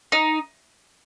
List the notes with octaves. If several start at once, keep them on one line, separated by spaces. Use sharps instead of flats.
D#4